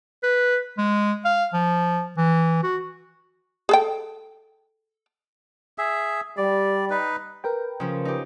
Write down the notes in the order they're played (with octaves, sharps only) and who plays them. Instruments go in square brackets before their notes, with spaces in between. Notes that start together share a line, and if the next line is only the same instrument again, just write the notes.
[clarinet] B4
G#3
F5
F3
E3
F#4
[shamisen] G#4 A4 G5
[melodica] G#4 E5
[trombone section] G3 [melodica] D5
[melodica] D#4 B4
[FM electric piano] A#4 B4 G5
[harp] C#3 F3
D#4 G4